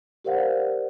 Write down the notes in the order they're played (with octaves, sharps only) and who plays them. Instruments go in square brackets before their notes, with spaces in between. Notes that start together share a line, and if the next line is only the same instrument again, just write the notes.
[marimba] G4 A#4 C5 D5 F5 F#5